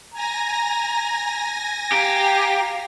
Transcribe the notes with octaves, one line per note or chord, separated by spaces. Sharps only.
G#5 A#5 A#6
G4 F5 A#5